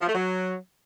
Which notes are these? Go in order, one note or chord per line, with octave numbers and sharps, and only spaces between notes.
F3
A3
F#3